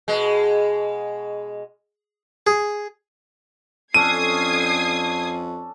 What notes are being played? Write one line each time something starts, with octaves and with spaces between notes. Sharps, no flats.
B2 G#3
G#4
F2 C#4 D4 A4 D#6 G#6 C7 D#7